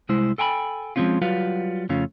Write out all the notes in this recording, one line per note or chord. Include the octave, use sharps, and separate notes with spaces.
C2 G#3 E4 C5
A4 G5 G#5 A#5 B5
F3 F#3 G#3 C4 C#4 F4
F#3 G3 F4 F#4 B4 F5
F2 C#3 A3 C#4 F4